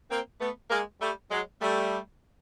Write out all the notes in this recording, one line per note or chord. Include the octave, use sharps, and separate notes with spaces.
A#3 C4
A3 B3
G#3 A#3
G3 A3
F#3 G#3
G3 A3